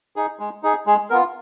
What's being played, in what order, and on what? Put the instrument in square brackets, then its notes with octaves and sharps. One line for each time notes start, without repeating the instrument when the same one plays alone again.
[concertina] D#4 G#4
G#3
D#4 G#4
G#3 G#4
B3 F4 A#4